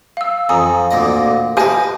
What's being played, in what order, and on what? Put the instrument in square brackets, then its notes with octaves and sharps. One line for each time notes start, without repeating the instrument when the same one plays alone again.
[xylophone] F5 E6
[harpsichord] F2 [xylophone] G#5 A#5 D#6
[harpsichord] D2 A#2 D#5
[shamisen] G4 G#5 A5 [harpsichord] B4 D#5